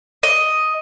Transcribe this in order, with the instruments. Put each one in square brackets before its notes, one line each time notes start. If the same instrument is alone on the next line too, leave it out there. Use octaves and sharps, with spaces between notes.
[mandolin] D#5